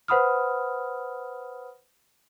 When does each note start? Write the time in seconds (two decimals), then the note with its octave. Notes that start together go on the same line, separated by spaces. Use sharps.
0.08 B4 C5 F#5 B5 D#6 F6